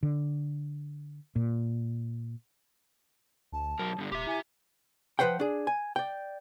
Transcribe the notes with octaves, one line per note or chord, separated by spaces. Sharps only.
D3
A#2
D2 A5
B1 F#3 A#4
G2 D3 G3
D#1 G4 E5 C6
E4 G#5
F3 G#3 B4 C5 F#5 G5
D4 G#4
G#5
D5 G5